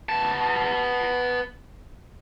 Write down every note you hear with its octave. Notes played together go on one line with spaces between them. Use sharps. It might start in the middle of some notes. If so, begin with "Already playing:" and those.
B3 A5